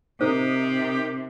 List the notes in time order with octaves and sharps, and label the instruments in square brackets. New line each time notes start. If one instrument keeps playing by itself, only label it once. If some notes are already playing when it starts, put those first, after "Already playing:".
[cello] C3 [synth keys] D#4 A#4 D#6 [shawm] G4 [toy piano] C5